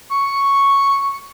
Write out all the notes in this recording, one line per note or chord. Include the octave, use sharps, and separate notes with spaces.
C#6